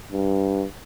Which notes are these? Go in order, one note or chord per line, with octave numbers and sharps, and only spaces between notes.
G2